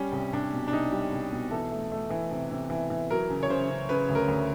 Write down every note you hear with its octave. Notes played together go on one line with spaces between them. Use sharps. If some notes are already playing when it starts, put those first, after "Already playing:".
Already playing: G3 C#4
C2
C2 D4
B2
D4
C2 D#4
G3
C2
B2
E3 A4
A3
A3
E3
C3
C3
E3
E3
F#3 A#4
C#3
C#5
C#3 C5
C#3
C#3 B4
D2
A#4
D2